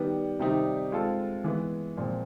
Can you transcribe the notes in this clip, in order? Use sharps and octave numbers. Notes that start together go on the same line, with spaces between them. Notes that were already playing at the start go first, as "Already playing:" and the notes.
Already playing: D#3 G3 B3
C3 D#3 G3 C4 D#4
G#3 C4 F4 A4
E3 G#3 B3
A#2 F3 G#3 C4